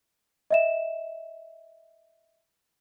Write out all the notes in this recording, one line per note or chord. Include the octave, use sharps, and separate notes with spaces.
D#5 E5 E7